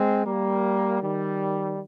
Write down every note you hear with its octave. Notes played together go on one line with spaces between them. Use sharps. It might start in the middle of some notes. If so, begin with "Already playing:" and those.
Already playing: G#3 C4
G3 A#3
D#3 G3